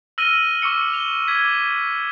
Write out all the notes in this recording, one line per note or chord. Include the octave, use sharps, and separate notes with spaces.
E6 F6 A#6 D#7 F#7 G7
C#6 D6 E6 C#7
F7 G7
D6 G#6 B6
D6